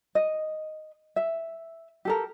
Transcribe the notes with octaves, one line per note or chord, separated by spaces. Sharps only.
D#5
E5
G4 A4 A#4